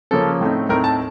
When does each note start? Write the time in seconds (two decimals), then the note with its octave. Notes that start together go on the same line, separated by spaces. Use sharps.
0.11 C#3 F3 A#3 C#4 A4
0.41 A2 A3 C4 D#4
0.69 A2 A3 C4 D#4 A#4
0.84 A5